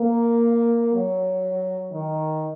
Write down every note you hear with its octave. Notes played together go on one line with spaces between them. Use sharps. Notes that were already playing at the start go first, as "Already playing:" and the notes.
Already playing: A#3
F#3
D#3